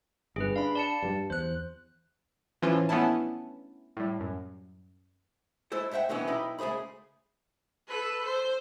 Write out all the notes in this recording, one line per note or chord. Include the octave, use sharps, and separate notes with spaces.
G1 G2 G#4 B4
D4 F5 B5
D5 A5 C#7
G2 G3
E2 C5 F#6
A2 E3 F3 C#4 F4
A3 B3 C#4 D4 E4 A5
A2 G3
F#2
G#3 E4 A4 C5
G#3 C5 E5 F#5 G5
B2 D3 E3 G3 B3 C#4
B1 D#4 E4 G4 B4 B5
C#2 A3 G#4 C5 B5
A4 B4
C5